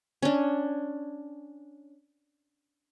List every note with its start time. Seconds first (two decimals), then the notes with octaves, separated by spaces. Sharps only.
0.22 C#4 D4